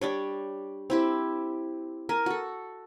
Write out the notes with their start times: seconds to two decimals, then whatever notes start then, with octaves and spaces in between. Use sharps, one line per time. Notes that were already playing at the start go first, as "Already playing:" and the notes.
0.01 G3 D4 C#5
0.90 C4 E4 G4
2.09 A#4 G#5
2.26 F#4 A4